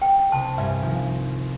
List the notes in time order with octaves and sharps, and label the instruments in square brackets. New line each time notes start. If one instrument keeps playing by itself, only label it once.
[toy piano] G5
[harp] C2 B5 [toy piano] A5
[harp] G2 G3 G#5 [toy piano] E5
[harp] D#3 F3